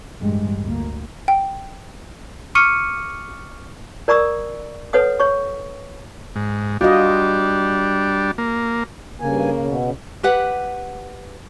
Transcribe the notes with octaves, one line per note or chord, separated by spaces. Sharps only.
A1 G2 G3 G#3
D2 A#3
G5
C#6 D6 F6 C#7 D#7
A#4 D5 A#5 C#6 D#6 E6
A4 B4 C#5 F#5 D#6
C#5 C#6
G#2
G3 D4 F4 F#4 D#5
A#3
G2 C#3 A#3 G#5
B2
G4 B4 F#5